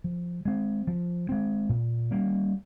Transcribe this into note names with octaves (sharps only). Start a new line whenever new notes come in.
F3
G#3 C4
F3
G#3 C4
A#2
G3 A#3 C#4